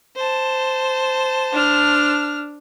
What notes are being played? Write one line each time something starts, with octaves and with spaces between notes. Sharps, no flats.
C5 A5
D4 F6